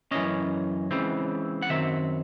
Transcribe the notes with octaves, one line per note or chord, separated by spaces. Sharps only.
F#2 E3 A3 C#4 D#5
C#2 C#3 E3 C4
F#5
F#2 D#3 F#3 C4 E5